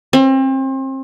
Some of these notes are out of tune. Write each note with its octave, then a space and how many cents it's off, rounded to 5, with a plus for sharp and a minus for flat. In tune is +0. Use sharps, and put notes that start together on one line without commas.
C4 +35